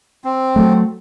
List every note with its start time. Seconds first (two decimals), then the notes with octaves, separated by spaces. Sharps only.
0.24 C4
0.56 F#3 A3